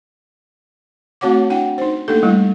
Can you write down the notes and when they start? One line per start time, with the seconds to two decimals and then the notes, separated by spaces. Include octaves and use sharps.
1.21 A3 C4 F#4 C#5 F#5 D6
1.50 D4 E4 F#5 G5
1.78 D#4 C5
2.08 A3 A#3 D4 D#4 G4 A4
2.23 G3 A3 E4